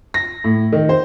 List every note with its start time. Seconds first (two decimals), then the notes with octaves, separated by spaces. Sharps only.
0.14 A#6
0.44 A2
0.73 D#3
0.89 C5